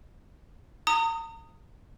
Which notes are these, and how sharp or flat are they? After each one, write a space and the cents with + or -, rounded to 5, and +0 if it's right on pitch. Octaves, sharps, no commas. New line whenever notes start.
A#5 -35 D#6 +0